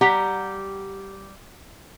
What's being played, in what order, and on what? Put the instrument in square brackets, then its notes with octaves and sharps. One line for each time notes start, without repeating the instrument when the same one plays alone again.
[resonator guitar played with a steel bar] G3 G4 F#5 A#5